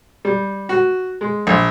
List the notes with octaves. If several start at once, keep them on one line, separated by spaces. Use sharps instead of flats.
G3
F#4
G#3
A#1